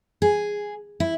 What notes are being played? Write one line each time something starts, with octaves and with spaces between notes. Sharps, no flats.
G#4
E4